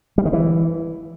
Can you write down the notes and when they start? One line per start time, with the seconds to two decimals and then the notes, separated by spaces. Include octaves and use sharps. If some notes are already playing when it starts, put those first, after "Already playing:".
0.18 G3
0.25 D#3
0.33 E3